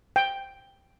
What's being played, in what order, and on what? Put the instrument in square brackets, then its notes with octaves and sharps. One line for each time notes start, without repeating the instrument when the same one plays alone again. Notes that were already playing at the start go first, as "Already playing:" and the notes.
[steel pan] G5